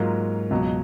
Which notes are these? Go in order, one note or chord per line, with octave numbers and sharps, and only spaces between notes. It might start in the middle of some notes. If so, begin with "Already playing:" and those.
Already playing: G#2 F#3 A#3 F4
C#2 B2 F#3